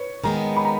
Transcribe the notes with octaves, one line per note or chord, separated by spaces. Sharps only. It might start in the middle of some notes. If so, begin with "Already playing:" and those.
Already playing: B4 C#5
D#3 G#3 B3 A#5
B5
A#5